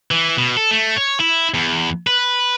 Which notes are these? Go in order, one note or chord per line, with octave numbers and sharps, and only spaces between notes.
E3
B2
A4
A3
C#5
E4
E2
B4